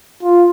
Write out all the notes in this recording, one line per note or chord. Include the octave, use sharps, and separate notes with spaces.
F4